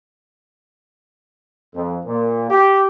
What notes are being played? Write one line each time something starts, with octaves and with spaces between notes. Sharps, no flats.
F2
A#2
G4